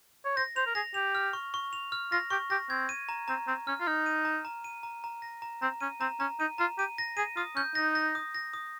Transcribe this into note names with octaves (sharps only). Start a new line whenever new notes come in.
C#5
C5 A#6
C5 F7
A#4
G#4 A#6
G4 F7
F6
C#6
C#6
F7
F6
F4 A#6
G4 C#6
G4 A#6
C4 G#6
D#7
A#5
C4 A#5
C4 A#5
C#4 F6
F4
D#4 F6
D#7
A#5
A#5
D#7
A#5
A#5
A#6
A#5
C4 A#5
C#4 D#7
C4 A#5
C#4 A#5
D#4 D#7
F4 A#5
G4 D#7
A#6
G#4 D#7
F4 D#6
C#4 G6
D#4 A#6
A#6
D#6
A#6
D#6